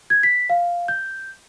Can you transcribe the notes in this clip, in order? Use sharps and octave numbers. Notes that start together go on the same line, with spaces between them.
G#6
B6
F5
G6